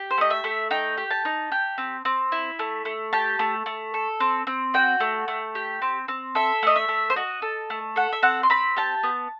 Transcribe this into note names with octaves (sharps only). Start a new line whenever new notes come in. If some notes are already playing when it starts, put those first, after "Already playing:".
Already playing: G4
C5
A3 D#5
E5
A3
D#4 G5
G4
A5
D#4
G4
C4
C4
E4
A3
A3
G4 A5
A3
A3
A4
C4
C4
F#4 G5
A3
A3
G4
C4
C4
A4 E5
A3 D#5
E5
A3
C5
F#4 D#5
A4
A3
A4 F#5
E5
C4 F#5
C6
C4 B5
G4 A5
B3